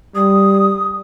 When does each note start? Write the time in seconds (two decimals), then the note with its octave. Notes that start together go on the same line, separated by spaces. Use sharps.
0.15 G3 D#6